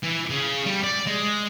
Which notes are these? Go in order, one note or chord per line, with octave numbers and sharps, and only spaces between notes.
E3
C#3
G3
D5
G#3